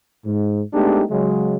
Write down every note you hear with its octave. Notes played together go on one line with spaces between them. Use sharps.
G#2
G#3 A3 B3 D4 D#4 G4
C#3 F#3 G#3